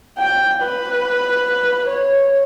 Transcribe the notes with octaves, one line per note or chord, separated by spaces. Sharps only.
G5
B4
C#5